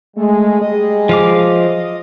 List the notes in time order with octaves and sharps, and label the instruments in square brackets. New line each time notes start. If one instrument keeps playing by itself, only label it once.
[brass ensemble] G#3 [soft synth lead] A3
[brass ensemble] G3 G#3 G#4 [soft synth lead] D#5
[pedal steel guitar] F3 F5 D6